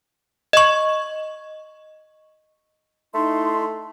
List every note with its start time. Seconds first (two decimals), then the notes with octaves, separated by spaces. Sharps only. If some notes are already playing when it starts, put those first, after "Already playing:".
0.53 D#5 C#6
3.14 A3 D#4 E4 C6